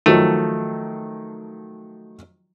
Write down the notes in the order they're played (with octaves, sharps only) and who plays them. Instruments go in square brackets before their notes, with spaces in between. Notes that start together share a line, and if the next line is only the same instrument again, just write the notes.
[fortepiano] D#3 F3 F#3 [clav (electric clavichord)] A3